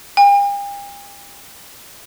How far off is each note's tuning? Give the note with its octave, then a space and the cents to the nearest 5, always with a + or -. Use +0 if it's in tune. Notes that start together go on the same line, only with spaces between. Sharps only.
G5 +45